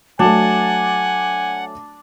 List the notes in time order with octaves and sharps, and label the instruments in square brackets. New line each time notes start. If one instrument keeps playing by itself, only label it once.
[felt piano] F#3 A3 [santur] D4 [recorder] F#5 [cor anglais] G#5